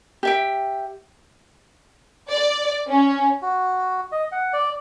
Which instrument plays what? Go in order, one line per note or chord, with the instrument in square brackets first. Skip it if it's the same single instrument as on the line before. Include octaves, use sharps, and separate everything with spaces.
[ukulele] G4 E5 G5
[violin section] D5
C#4
[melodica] F#4
D#5
F#5
D5